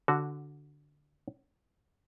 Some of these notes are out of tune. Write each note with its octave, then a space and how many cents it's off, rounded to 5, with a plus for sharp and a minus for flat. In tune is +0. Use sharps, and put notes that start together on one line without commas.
D3 -5 F#4 +0